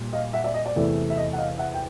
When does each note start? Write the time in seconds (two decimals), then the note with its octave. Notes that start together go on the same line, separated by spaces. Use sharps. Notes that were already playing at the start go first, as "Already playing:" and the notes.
Already playing: A#2 G3
0.13 D#5 F5
0.33 E5 F#5
0.44 D5 E5
0.54 D#5
0.66 D5
0.76 E2 C3 E3 A3
1.10 E5
1.17 D#5
1.33 F#5
1.38 D#5 F5
1.58 E5 F#5
1.74 G5